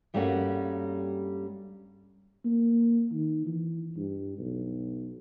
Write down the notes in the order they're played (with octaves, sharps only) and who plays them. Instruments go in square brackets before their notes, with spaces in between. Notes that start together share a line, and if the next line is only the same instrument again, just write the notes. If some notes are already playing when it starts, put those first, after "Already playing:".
[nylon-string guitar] G2 G3 A3 A#3 C#4 F#4
[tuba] A#3
D#3
E3
G2
B1